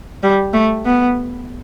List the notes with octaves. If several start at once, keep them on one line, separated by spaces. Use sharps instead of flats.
G3
A3
B3